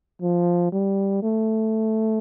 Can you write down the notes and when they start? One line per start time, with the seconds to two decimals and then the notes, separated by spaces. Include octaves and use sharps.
0.22 F3
0.72 G3
1.23 A3